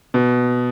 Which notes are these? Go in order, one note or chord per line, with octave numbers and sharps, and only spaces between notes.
B2